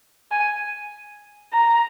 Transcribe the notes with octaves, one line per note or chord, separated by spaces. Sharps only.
G#5
A#5